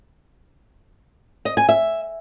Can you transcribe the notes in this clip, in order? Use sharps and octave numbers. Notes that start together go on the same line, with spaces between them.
D#5
G#5
E5